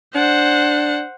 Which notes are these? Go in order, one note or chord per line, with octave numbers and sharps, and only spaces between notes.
D4 C5 F#5